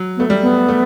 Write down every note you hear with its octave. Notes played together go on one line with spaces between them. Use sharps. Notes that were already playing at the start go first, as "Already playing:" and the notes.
Already playing: F#3
B3
A3
G3
B3
A3